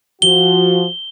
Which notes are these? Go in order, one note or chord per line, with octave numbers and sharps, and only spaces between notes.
F3 F#4 G7